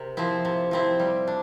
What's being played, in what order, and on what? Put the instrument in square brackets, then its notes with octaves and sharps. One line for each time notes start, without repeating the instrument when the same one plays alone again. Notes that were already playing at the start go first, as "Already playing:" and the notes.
Already playing: [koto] C3 A#4
F3 C4 E4
C3
F3 C4 E4
G3
D4